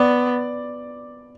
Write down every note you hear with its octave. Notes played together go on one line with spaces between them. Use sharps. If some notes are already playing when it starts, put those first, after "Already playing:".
Already playing: B3 D5